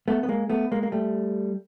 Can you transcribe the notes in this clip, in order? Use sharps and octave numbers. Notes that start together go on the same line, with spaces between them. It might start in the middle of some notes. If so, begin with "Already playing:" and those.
A3 B3
B3
G#3 A#3
A3 B3
G#3 A#3
A#3
G3 A3